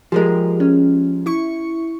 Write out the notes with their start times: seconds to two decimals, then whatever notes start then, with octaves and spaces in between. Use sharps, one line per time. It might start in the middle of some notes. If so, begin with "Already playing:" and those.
0.12 F3 G#3 G4 G#4 A#4
0.60 C#4
1.26 E4 C#6 C#7